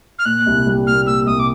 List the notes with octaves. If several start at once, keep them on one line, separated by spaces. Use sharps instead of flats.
F6
A#2 F#6
C2
G3
A#3 F6
A#2 E6
C2 D#6
D6